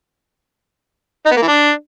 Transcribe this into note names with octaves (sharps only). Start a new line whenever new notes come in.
D#4
B3
A#3
E3
D4